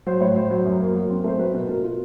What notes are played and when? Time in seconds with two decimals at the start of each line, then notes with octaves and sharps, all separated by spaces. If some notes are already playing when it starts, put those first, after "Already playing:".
0.07 F#3 C5
0.21 A2 C#5
0.36 A2 C5
0.51 F#3
0.65 F#2
0.81 A#3
0.95 F#3
1.10 C4
1.24 A3 C5
1.39 F#3 B4
1.54 B2 A#4
1.69 B2 A#4
1.83 F4